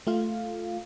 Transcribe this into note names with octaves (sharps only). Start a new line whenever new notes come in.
A3 F4 F5